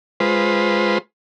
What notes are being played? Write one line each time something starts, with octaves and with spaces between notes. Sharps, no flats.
G#3 F4 B4 C5